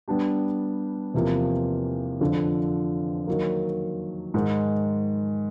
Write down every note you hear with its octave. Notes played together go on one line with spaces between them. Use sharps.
G3 B3 D4 G4
E2 C3 F3 A#3
F2 D3 F3
D#3 F#3 A#3
G#2 D#3 G#3